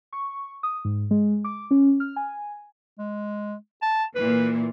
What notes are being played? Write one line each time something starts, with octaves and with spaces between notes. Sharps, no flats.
C#6
D#6
G#2
G#3
D6
C#4
F6
G#5
G#3
A5
A#2 E3 B4